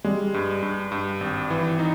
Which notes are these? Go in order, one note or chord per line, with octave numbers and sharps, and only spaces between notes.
G3 G#3
G2
G2
G2
G#1
E3
D#4